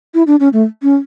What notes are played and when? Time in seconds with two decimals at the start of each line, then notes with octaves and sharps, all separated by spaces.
0.14 E4
0.27 D4
0.40 C#4
0.53 A3
0.82 C#4